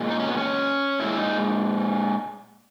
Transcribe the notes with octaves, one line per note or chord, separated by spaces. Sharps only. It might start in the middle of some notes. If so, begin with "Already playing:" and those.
Already playing: A#2 G#3
D#4
C#4
B3
C#4
A#2 G#3 E4
D#4